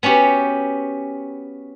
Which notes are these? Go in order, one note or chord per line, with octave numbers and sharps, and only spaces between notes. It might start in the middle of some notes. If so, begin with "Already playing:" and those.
B3 C#4 F#4 G4